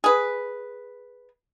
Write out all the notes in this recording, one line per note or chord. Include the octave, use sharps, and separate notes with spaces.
G#4 B4